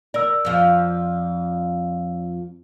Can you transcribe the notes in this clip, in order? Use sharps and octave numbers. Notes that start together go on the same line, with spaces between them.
A#4 D5 E6
F2 F3